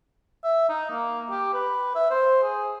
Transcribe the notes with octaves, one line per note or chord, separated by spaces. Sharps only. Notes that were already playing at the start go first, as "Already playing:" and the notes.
E5
D#4
A#3
G4
B4
E5
C5
G#4